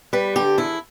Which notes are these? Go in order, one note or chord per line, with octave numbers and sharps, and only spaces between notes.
G3 B4
D3 G4
E2 E4